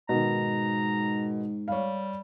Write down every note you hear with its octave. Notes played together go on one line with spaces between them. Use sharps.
G#2 B2 D#3 A#5
G3 C#5 F5